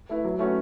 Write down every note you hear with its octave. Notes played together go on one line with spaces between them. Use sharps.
A3 E4 B4
F#3
A3 C#4 F#4 B4